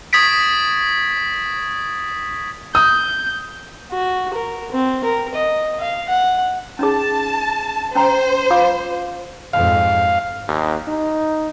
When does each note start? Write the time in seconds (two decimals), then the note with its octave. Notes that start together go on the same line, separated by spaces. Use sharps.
0.13 C#6 D#6 G#6 A6 B6 D7
2.75 D#6 G6
3.92 F#4
4.33 A#4
4.72 C4
5.04 A#4
5.35 D#5
5.80 F5
6.09 F#5
6.79 C#4 D#4 G#4 A5
7.95 C#4 C5 G5 A#5
8.50 F4 F5 D6
9.53 F2 G#2 F5
10.48 D#2
10.88 D#4